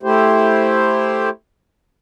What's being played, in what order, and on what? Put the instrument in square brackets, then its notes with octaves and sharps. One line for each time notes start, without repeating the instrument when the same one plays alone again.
[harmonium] A3 E4 G4 C5